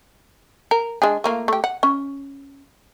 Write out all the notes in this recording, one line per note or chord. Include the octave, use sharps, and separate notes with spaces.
A#4
G#3 D4 G#4
A3 A#3 F4
A3 G4
F#5
C#4